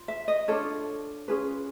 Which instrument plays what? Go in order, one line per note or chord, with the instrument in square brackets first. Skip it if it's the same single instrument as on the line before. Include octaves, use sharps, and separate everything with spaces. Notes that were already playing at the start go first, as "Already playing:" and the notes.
Already playing: [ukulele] F4
E5
D#5
D4 F4 A4 C#5
C#4 F4 G#4 B4